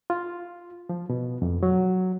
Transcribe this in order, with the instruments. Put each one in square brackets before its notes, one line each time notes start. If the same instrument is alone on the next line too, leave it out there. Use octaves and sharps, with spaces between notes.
[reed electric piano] F4
F3
B2
F2
F#3